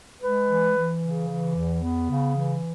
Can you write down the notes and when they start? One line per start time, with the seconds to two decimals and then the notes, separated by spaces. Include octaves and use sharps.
0.21 G#3 B4
0.48 E3
0.75 E3
1.02 C#3
1.28 E3
1.55 E2
1.82 B3
2.09 C#3
2.36 E3